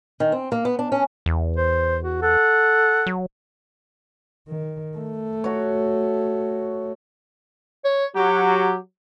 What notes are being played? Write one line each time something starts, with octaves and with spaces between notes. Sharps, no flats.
D#3
C4
A#3
B3
D4
C#4
E2
C5
F#4
A4 F#5
F#3
D#3
A3
F#4 C#5
C#5
F#3 G4